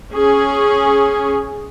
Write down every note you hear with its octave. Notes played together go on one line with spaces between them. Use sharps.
C#4 G#4